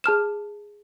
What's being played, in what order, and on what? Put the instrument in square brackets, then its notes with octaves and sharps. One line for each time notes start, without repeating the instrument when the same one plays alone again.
[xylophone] G#4 A5 F6 E7